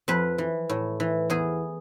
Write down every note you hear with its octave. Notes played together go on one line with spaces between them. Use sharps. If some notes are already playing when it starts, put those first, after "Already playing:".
F2 B4
E3
A2
E3
E2 G#4